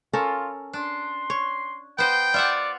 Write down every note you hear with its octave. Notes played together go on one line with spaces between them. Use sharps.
C#4 F4 A4 A#4
D4 C6
C#5
B3 C5 D#5 G5
F4 D5 E5 F#5